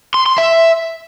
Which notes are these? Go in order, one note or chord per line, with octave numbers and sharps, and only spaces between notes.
C6
C6
E5